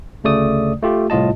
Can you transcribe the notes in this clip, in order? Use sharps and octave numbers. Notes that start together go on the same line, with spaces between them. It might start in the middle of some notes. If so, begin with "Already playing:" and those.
D2 C#3 A3 D5 D#6
A3 F4 G4
C2 A2 F4 D#5 A5